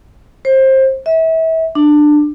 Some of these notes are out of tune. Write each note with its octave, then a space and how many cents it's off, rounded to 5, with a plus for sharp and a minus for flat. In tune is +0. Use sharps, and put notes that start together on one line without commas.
C5 +25
E5 -30
D4 +20